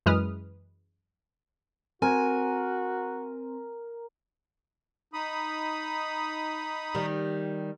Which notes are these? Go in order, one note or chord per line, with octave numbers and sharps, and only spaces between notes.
F#2 E3 G#3 B4 D#6 F6
C4 F#4 A#4 G#5
D#4 B5 D#6
D#3 G3